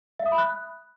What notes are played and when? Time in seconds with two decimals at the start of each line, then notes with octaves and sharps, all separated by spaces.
0.20 E5
0.26 D#6
0.32 B5
0.38 F#6